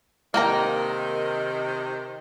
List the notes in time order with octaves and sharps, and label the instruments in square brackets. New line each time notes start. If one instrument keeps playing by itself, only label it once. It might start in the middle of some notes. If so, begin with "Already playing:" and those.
[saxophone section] C3 D#3 [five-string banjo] A#3 G5 A#5